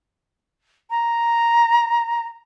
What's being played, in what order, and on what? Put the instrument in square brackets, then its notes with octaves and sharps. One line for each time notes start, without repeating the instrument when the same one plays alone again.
[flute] A#5